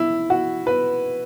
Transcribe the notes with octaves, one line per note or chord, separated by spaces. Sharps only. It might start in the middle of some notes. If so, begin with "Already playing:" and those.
Already playing: E4
F#4
B4